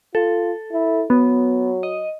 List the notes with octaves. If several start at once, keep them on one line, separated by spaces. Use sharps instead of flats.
F4 A4
E4
F#3 B3
D#5